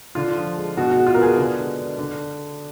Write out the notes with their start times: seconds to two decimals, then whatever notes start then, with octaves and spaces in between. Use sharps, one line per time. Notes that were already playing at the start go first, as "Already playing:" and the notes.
0.15 D3 F4
0.37 F3
0.57 G#3
0.77 B2 F#4
0.91 F#4
0.96 G#3
1.07 F4
1.14 A#4
1.17 B3 G#4
1.37 D3
1.58 G#3
1.78 D4
1.99 D3